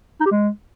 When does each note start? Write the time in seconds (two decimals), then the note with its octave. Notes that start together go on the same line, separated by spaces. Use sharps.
0.21 D#4
0.26 G4
0.31 G#3